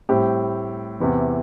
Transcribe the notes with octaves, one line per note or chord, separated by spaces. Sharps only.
A2 G3 C4 G4
E2 C3 E3